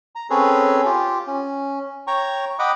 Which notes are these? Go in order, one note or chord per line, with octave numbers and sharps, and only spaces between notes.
A#5
C4 C#4 G#4 A4 B4 C#5
F4 G4
C#4
C#5 G5 A#5 C#6
D#5 F#5 G5 B5 D6